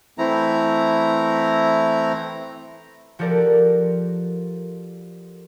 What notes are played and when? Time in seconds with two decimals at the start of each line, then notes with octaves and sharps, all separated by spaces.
0.18 E3 A3 C4 E4 A#5
3.19 F3 F#4 G4 A4 A#4 D5